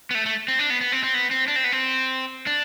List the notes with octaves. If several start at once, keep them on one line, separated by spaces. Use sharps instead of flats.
B3
A3
A3
C4
D4
B3
B3
C4
C4
B3
C4
D4
C4
B3
C4
D4